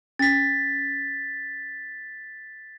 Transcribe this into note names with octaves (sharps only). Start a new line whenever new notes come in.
C#4 A6 B6